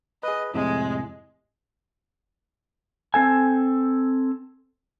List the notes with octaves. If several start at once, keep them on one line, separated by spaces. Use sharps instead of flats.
G#4 B4 D#5
F2 A2 C3 G#3
C4 A4 G#5